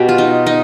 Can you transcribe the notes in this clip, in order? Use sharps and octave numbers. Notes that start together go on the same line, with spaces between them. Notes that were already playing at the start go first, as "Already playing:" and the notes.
Already playing: B2 B3 G4
F4
D#4
D#4